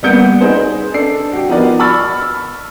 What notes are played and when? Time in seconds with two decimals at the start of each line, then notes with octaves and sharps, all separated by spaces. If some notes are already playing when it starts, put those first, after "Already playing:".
0.03 G3 A#3 B3 G6 C#7 D7
0.41 D#4 G#4 B4 C5
0.94 D4 A4 C7
1.32 F#4 G4
1.49 F3 B3 D#4 A#4 B4 D5
1.80 B5 C#6 E6 F6 A6